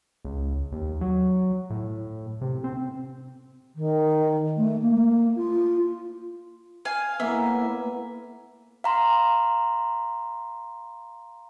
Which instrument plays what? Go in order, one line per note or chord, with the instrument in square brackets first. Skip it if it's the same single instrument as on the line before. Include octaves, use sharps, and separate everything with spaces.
[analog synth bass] C#2
D#2
F#3
A2
C3
C4
[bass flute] D#3
A3
A#3
F4
[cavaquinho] F5 G#5
[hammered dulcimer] A2 A#3 B3 [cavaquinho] E5
[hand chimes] F5 A#5 C6